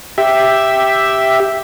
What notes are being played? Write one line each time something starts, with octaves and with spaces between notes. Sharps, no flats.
G4 E5